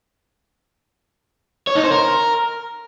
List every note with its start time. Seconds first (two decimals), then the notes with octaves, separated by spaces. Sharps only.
1.67 C#5
1.75 D#4
1.84 C5
1.92 A#4